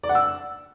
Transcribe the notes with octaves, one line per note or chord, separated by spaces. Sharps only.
D5
F#5
E6